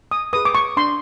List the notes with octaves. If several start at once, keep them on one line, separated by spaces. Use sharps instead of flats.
D#6
G#4 B4 D#6
D6
C#6
D4 C6